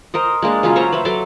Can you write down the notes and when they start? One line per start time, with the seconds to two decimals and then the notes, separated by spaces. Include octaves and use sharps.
0.14 A#4 C5 D#5
0.42 G#3 A#3 D4
0.63 C#3 F#3 C#4 F4
0.76 C5 C#5 A#5
0.92 B4 C5 E5
1.05 F#3 A4 C6 D6